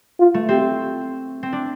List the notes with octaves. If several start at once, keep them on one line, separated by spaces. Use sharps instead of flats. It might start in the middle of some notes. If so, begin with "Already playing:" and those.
F4
A3
C4 G4
C4
D4